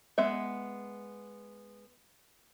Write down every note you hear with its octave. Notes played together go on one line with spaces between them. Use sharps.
G#3 B3 E5